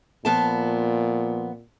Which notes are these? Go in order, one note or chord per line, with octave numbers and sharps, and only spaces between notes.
A#2 F3 B3 A5